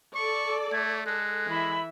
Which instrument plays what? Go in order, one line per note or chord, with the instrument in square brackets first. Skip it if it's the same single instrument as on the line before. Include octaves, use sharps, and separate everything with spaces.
[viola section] A4 D5 [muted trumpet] C#6
[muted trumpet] A3 [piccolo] G#6
[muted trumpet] G#3 [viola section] A4 [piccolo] F#6
[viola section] E3 E5 [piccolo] B5